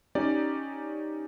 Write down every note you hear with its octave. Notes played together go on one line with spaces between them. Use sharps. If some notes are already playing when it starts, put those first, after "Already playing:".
C#4 D#4 G4 D5